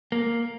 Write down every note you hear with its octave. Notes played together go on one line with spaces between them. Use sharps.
A#3